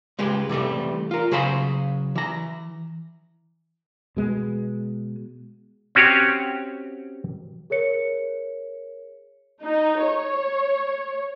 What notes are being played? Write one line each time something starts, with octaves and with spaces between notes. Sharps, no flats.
C#2 G#3 G4 B4
C3 E3 G3 A3
F4 A#4
C#3 F#3 G#4 C5 F5 B5
E3 A#5
B2 G#3 B3
C4 C#4 F#4 G4 C#5
G#4 A#4 C#5 C#7
D#4
C#5